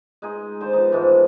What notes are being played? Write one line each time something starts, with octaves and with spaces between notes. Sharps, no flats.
G#3 D#4 G#4
D3 C5 A5
F3 B3 D#4
G#2 E3 F3 G#3